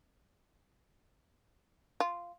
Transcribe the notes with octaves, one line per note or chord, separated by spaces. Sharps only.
F4